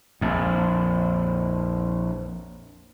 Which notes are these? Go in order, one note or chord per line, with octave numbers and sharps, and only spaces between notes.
A#1 F2